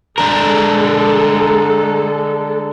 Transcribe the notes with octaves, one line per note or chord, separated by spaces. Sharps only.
D3 G#3 D4 A4 A#4